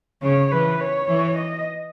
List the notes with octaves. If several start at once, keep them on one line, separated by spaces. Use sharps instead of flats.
C#3 C#5
E3 B4
C#5
E3
D#5